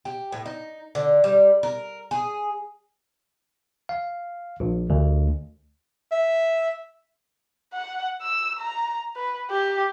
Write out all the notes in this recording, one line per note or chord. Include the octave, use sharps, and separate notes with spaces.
G4
A2
D#4
D3
G3
A#4
G#4
F5
A#1
D2
E5
F#5
E6
A#5
B4
G4